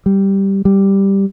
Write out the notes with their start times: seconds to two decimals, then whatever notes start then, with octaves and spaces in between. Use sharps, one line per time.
0.06 G3
0.65 G3